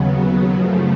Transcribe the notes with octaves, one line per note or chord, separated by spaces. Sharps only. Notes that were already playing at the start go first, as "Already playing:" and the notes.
Already playing: D#2 C#3 F#3 B3
F#2 C#3 F3 A3